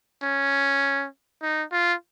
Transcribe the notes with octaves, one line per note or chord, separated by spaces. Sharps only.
C#4
D#4
F4